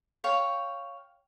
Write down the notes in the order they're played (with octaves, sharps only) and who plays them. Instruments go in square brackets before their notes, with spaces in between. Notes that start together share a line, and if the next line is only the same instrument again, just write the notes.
[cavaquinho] C#5 F5 G5